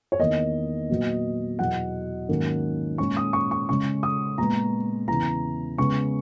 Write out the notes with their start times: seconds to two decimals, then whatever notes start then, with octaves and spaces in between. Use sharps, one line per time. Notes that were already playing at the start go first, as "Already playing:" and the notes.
0.12 C#5
0.19 E2 D#3 A#3 D#5
0.90 A#2 F#3 B3
1.59 E2 B2 F#3 F#5
2.29 G#2 D#3 F#3 A#3 C#4
2.98 A#2 G#3 C#4 C#6
3.17 D#6
3.33 C#6
3.51 C#6
3.69 C#3 G#3 C#4 C#6
4.03 D#6
4.38 A#2 G#3 B3 A#5
5.08 E2 C#3 E3 A#5
5.78 C#3 G#3 B3 C#6